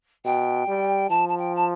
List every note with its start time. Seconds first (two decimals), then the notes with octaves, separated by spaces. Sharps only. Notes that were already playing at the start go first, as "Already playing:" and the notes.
0.25 B2 G5
0.68 G3
1.09 F3 A5
1.28 A5
1.38 G5
1.55 A5